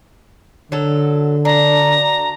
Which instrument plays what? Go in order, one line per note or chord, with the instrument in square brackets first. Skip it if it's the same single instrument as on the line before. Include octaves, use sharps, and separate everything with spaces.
[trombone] D3 [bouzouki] F#3 A4
[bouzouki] D4 F#4 [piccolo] A#5